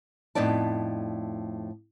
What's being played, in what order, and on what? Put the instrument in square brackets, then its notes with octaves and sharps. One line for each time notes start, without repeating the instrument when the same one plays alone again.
[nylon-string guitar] F2 A2 B3 D#4 D5 A5